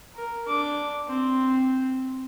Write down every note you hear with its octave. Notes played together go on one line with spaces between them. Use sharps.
A#4
D4 D6
C4